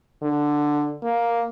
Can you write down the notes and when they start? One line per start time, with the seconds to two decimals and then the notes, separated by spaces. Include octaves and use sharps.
0.23 D3
1.03 A#3